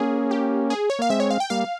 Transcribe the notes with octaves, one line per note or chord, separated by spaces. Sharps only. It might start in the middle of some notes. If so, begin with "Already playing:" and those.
Already playing: A#3 C#4 G#4
G4
G#4
C#5
A#3 F5
G#3 C4 E5
C#5
F5
G5
G3 A#3 F5